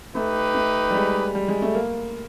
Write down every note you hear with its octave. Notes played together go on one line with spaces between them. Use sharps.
A3 D#4 G4 B4
A3
G3
G#3
G3
G#3
A3
A#3